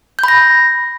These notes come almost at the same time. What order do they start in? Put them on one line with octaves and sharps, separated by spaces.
G6 B5 A#6